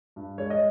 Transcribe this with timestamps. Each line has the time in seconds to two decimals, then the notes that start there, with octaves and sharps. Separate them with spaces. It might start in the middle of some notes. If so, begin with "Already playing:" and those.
0.16 G2
0.38 G#3 C#5
0.50 D#5